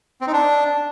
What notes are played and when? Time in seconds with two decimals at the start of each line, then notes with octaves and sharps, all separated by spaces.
0.21 C4
0.27 D#4
0.33 D4